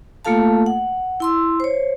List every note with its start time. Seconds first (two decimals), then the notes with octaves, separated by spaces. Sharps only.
0.25 A3 A#3 F4 A4 F5 A5
0.66 F#5
1.20 E4 C6 E6
1.60 C5 C#5